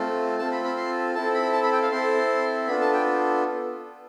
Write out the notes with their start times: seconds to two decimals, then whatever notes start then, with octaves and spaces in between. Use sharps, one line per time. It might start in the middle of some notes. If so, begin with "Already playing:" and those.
Already playing: A3 C4 F4 A4
0.39 C4 F4 A4 A5
0.52 B5
0.64 B5
0.77 C6
1.15 C4 E4 A4 A5
1.34 B5
1.53 A5
1.63 B5
1.72 G5
1.82 F5
1.91 C4 E4 A4 C6
2.67 B3 D4 F4 A4 B5
2.81 A5
2.93 G5